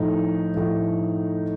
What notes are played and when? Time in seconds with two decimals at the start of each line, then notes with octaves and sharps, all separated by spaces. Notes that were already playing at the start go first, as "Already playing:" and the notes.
Already playing: A2 F3 A3 D#4
0.54 A2 F3 A3